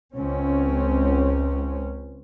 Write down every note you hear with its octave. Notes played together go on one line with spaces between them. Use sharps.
C#2 C4 C#4